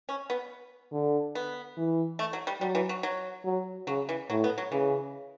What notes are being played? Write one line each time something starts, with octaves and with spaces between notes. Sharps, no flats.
C#4
B3
D3
B3
E3
A3
F#3
G3
F#3 G3
E3
F#3
F#3
F#3
C#3 F#3
E3
A2 F#3
B3
F#3
C#3 E3